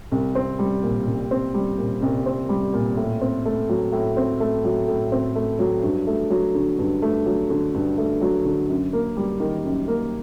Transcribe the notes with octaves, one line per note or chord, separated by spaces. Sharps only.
C2
C4
G3
A#2
C2
C4
G3
A#2
C2
C4
G3
A#2
A2
C4
A3
F#3
A2
C4
A3
F#3
A2
C4
A3
F#3
G2
A3
F#3
D3
G2
A3
F#3
D3
G2
A3
F#3
D3
F#2
A#3
G3
D#3
F#2
A#3